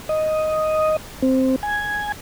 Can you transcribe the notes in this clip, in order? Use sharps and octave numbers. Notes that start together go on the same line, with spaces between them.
D#5
C4
G#5